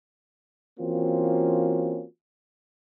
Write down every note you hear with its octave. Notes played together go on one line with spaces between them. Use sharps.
E3 A#3 C4 C#4 F4 F#4